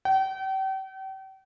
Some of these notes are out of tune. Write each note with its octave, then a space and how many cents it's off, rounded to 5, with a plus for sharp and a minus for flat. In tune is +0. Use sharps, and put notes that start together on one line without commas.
G5 -40